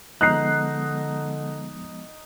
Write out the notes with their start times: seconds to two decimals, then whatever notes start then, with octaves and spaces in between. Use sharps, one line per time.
0.21 D3 F3 G#3 B3 D#4 A#5 F#6 C7